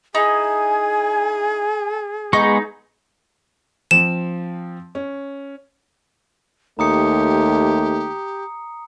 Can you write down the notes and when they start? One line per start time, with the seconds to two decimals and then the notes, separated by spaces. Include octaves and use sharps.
0.15 D#4 E4 G#4 G#5
2.33 G#3 B3 D#4 C#6
3.91 F3 C4 E7
4.95 C#4
6.79 D#2 A3 G4 A#5 D#6 C#7